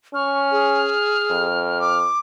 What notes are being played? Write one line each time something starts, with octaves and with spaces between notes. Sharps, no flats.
C#4 C#6 F6
G#4
F2
D6